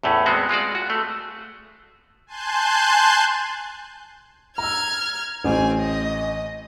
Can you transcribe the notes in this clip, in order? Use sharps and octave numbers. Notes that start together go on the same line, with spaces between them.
E2 A2 A3 C#4
G#3 B3 C4 F#4
G#3 F4 F#4 D5
F#4
A3
G#5 A5 C6 F#6 G6
A#5 E6 F6 G#6
A1 C4 G#5
D#5